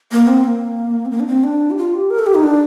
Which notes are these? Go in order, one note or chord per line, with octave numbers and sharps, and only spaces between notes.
A#3
C4
A#3
C4
A#3
D4
C4
D4
G4
F4
G4
A#4
A4
G4
D#4
D4